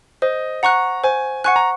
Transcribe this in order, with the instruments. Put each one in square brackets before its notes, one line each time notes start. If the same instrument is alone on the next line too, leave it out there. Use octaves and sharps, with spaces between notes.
[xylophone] C5 [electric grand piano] D#5
[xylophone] F#5 C#6 F#6 [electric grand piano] A#5
[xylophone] C5 [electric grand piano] G#5
[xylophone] F#5 C#6 F#6 [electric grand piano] G#5
[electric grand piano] A#5